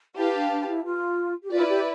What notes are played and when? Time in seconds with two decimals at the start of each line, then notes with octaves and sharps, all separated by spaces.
0.16 E4 G4 B4 F5 A5
0.33 D4
0.50 D4
0.67 E4
0.84 F4
1.43 G4
1.51 E4 F4 B4 D5
1.68 G4